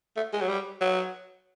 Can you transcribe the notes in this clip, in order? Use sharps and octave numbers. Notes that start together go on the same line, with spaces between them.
A3
G#3
F#3
G3
F#3